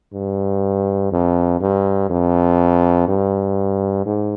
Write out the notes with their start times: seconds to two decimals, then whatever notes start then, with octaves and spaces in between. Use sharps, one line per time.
0.13 G2
1.12 F2
1.61 G2
2.10 F2
3.08 G2
4.06 G#2